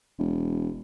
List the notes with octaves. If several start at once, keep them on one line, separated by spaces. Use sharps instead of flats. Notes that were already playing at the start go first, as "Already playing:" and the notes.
E1